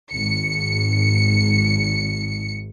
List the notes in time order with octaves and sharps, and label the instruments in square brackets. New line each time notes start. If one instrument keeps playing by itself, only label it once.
[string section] G#1 C#7